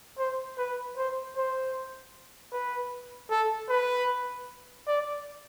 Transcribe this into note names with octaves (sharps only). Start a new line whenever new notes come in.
C5
B4
C5
C5
B4
A4
B4
D5